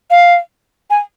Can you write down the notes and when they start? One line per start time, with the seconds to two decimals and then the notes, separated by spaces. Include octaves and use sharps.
0.11 F5
0.90 G#5